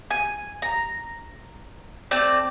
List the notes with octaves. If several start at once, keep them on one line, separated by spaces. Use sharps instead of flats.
G#5
A#5
A3 C4 D5